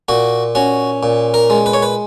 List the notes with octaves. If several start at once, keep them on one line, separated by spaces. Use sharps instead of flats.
A#2 F#4
C#4 F#4
A#2
A#4
G#3
B4
C#5
B4